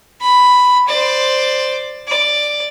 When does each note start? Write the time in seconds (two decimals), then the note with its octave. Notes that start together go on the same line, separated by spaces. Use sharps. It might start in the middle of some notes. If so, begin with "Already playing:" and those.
0.21 B5
0.88 C5 D5
2.08 D5